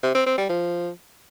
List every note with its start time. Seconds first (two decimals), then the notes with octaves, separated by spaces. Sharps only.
0.03 C3
0.15 C4
0.26 C4
0.38 G3
0.49 F3